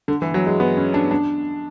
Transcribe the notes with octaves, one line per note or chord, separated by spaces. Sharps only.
D3
E3
F#3
G#3
B3
C#4
D4
D4